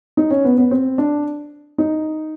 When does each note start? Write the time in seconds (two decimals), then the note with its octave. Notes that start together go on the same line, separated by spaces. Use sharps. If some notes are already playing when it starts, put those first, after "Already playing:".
0.17 D#4
0.31 C#4
0.45 B3
0.58 B3
0.71 C4
0.98 D4
1.78 D#4